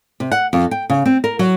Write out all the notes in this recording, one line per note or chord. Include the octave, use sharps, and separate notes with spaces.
C3
F#5
F2
G5
C#3
C4
A#4
F#3